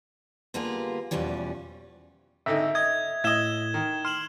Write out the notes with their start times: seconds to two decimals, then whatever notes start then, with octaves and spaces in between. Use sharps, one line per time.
0.54 D3 G3 A#3 B3 F4 G#4
1.11 E2 B2 F3 G3 C#4
2.46 G#1 D3 D#4 E5
2.75 D#5 G#6
3.24 A2 D#5 E5 G#6 E7 G7
3.74 D#3
4.05 C6 F6 E7 F#7